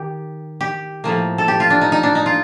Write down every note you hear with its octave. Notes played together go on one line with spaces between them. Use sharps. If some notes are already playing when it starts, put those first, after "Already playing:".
Already playing: D#3 G4
G4
A2 F3 A#3
A4
G4
F4
D4
D#4
D#4
D4
D#4
F4